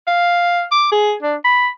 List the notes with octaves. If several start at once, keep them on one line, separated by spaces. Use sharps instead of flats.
F5
D6
G#4
D4
B5